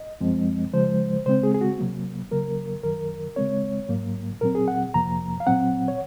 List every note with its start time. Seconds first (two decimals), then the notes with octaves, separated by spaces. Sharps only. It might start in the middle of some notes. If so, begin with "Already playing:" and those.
Already playing: D#5
0.21 F#2 F3 G#3 C4
0.74 C#3 F3 G#3 C5
1.26 C#3 G#3 C4 C5
1.43 G#4
1.54 G#4
1.61 F#4
1.78 C3 F#3 A#3
2.31 C#3 F#3 A#3 A#4
2.83 F#2 D#3 F#3 A#4
3.36 C#3 G#3 C4 C#5
3.89 G#2 F#3 A#3
4.41 A#2 F#3 C4 A#4
4.55 G#4
4.68 F#5
4.94 F2 C3 F3 A#3 A#5
5.40 F5
5.47 A#2 F#3 C4 F#5
5.88 C#5